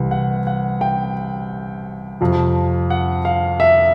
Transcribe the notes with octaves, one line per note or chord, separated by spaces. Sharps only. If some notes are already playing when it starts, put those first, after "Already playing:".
Already playing: C2 C3 E3
F#5
F#5
G5
F2 C3 F3
F#5
F5
E5